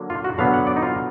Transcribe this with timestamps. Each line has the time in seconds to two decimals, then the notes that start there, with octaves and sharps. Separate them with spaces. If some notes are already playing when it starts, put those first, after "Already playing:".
Already playing: D3 F#3 A#3
0.10 F4
0.24 F#4
0.38 D3 F#3 B3 F5
0.54 F#5
0.67 D5
0.76 D#4
0.83 F4